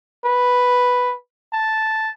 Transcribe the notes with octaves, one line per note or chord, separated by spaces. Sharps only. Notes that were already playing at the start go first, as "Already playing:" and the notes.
B4
A5